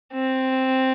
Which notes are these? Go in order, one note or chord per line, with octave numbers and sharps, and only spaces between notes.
C4